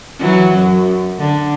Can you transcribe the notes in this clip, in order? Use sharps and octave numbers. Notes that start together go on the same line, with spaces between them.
E3 F#3
F#2
D3